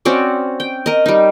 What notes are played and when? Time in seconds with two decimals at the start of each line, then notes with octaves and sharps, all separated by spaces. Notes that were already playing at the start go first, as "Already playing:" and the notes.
0.05 C4 C#4 F#4 D5
0.60 G5
0.86 A#4 D#5
1.06 G3 D#4